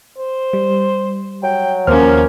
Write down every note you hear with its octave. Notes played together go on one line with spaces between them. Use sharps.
C5
G3
F#3 G5
D#2 F3 A#3 C#4 C5 F6